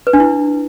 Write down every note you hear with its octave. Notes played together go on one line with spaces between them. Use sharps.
B4
D4
E4